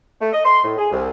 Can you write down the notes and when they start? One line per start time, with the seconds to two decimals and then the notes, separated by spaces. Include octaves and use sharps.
0.21 A3
0.33 D#5
0.45 C6
0.64 A2
0.78 G#4
0.92 C2